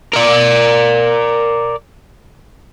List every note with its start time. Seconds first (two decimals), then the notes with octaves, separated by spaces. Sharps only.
0.14 A#4 D5